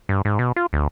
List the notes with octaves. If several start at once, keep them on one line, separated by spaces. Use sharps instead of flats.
G2
G#2
B2
F4
D2